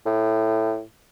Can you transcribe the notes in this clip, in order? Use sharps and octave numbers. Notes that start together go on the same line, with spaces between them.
A2